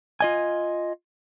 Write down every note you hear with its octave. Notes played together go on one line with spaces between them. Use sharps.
F4 D#5 G#5